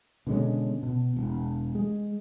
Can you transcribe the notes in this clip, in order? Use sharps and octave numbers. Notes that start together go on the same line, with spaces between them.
B2 D3 G#3 C#4
B2
E1
G#3